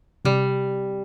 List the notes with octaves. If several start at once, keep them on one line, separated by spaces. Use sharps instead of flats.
C3 G3